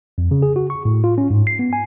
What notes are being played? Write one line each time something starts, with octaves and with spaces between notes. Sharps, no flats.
F2
C#3
G#4
F#4
C#6
A2
F4
C#4
G#2
C7
B3
G#5